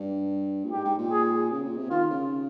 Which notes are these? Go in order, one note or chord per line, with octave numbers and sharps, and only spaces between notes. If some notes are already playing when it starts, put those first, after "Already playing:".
Already playing: G2
A#2
G#2 G4
G#2
A#2
G#4
C#3
A#2
C3
D#3 F4
C#3